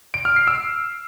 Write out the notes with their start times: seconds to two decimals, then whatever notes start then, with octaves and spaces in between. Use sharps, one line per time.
0.14 D7
0.25 F6
0.36 C7
0.47 E6